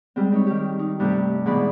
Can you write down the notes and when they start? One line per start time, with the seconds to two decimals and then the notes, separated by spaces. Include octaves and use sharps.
0.16 G3 G#3 C4
0.32 C4 D#4 C#5
0.46 D#3 G4
0.79 D#4
1.00 G2 C3 A3 G4
1.46 G#2 B2 E3 G#4 D5 B5